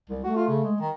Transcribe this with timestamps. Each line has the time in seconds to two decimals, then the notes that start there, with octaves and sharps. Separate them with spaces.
0.10 C2
0.24 A3 F#4
0.36 F4
0.48 C#3
0.63 G#3
0.80 D#3